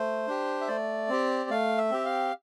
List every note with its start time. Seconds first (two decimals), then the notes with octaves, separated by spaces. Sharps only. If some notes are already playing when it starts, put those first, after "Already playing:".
Already playing: A3 C5
0.27 D4 G4
0.61 E5
0.68 A3 D5
1.09 C4 G4
1.50 A3 F5
1.77 E5
1.91 C4 G4
2.05 F5